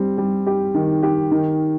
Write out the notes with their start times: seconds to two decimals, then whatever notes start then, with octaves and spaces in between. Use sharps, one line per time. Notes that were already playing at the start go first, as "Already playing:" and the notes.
Already playing: G3 C4
0.18 G3
0.47 G4
0.75 D#3
1.03 G4
1.31 D#3